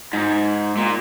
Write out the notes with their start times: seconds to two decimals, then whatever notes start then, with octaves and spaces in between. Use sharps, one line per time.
0.13 G#2
0.77 A#2